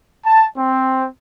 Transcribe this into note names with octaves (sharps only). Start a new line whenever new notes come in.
A5
C4